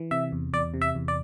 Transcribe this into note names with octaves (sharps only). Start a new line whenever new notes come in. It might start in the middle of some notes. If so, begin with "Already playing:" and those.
Already playing: E3
C3 E5
E2
E2 D5
C3
E5
E2
D5